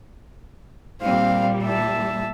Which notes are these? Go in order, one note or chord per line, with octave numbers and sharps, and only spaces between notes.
A#2 G3 C4 F5
E5 A5